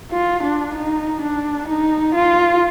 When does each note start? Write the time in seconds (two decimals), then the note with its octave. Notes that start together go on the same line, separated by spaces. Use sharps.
0.12 F4
0.43 D4
0.75 D#4
1.21 D4
1.68 D#4
2.15 F4